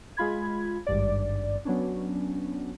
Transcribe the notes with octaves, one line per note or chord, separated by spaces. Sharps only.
G#3 F4 B5 G#6
G#1 G2 D5
F#3 B3 C#4 D4